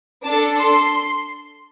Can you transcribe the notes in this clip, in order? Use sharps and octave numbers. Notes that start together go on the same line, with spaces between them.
D4 A4 A5
C6